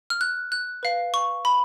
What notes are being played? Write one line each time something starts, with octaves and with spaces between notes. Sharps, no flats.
F6
F#6
F#6
B4 F5
C#6
B5